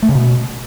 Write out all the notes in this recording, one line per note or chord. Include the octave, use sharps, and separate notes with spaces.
A3
C#3
B2